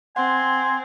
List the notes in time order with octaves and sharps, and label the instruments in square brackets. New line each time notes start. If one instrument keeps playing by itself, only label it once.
[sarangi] C4 [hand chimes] F#5 [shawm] G#5 [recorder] C6